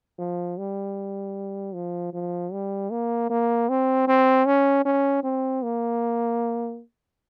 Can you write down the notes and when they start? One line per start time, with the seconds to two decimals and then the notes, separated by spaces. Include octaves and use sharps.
0.19 F3
0.58 G3
1.74 F3
2.13 F3
2.52 G3
2.91 A#3
3.30 A#3
3.69 C4
4.08 C4
4.46 C#4
4.85 C#4
5.24 C4
5.63 A#3